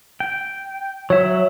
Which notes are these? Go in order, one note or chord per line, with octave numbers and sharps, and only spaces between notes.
G5
F#3 C#5 E5